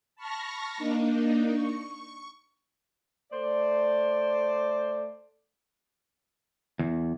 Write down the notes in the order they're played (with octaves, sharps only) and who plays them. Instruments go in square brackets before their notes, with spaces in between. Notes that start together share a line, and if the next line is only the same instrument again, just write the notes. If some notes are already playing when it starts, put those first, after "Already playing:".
[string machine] A5 B5 C#6 F6 A#6
A#3 D4 D#4
C#6
[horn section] A3 C5 D5
[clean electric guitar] E2